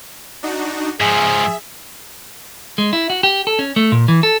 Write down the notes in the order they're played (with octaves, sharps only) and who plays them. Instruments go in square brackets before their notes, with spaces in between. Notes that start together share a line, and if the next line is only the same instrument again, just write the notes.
[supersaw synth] D4 D#4 F#4
[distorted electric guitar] G#2 F3 [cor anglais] G#4 [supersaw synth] E5
[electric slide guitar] G#3
E4
F#4
G4
A4
C#4
A3
A#2
E3
A4